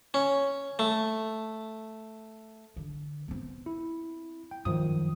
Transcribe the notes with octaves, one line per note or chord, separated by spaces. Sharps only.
C#4
A3
D3
B3 C4
E4
G5
F#2 D#3 F3 D#6